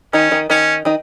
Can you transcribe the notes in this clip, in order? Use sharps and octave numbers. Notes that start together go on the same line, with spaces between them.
D#3 C#4 D#4
D#3 D#4
D#3 C#4 D#4
D#3 D#4